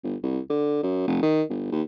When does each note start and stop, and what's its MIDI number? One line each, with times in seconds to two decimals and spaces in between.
0.03 0.16 31
0.23 0.39 36
0.50 0.82 50
0.83 1.06 42
1.07 1.19 29
1.22 1.43 51
1.49 1.71 31
1.72 1.82 39